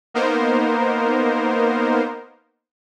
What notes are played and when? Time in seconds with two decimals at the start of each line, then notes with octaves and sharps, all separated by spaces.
0.14 A#3 B3 D#4 A#4 C5